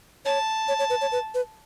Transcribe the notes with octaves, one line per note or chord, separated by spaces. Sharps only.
C#5 A5
C#5
C#5
B4
C#5
B4
B4